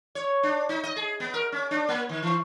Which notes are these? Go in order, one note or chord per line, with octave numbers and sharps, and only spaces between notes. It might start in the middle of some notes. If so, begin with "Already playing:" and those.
C#5
D4
D#4
D#5
G#4
B3
A#4
C#4
D4
A#3
D#3
E3